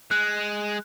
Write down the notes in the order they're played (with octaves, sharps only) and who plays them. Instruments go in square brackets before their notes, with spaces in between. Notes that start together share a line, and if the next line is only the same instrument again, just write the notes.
[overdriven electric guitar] G#3 [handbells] F#6